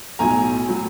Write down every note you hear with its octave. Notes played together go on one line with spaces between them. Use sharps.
B1 A2 F#3 G#5 A#5
A2 F#3